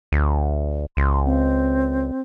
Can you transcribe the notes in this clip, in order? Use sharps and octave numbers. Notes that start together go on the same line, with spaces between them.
D2
C#2 C6
C4